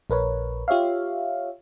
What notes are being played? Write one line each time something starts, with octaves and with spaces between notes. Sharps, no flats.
A#1 A#4 B4 C#5
F4 G4 C#5 E5 F5